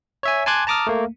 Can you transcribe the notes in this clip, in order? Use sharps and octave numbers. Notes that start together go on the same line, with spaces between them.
C#5 E5 G#5
G#5 A5 C6 D6 F#6 G#6
A5 A#5 D6 D#6 F6
A3 A#3